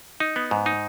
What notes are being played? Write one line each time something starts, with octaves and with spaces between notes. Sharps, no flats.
D#4
B3
G#2
D#4